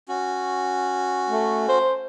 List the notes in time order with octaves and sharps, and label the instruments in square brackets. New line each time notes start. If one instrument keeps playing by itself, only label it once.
[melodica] C#4 F#4
[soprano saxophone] A3
C5